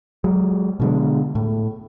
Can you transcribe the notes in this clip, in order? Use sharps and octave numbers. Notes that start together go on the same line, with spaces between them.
F#3 G#3
B2 D3 G#3
A2